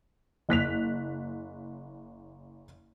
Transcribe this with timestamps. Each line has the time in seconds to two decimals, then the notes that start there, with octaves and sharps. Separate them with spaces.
0.49 F#1 F#6 B6 F7